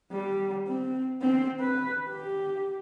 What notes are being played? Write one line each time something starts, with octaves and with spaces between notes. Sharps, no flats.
G3
C4
C4
B4
G4